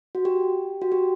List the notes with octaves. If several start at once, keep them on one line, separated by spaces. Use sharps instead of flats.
F#4
G4
F#4
G4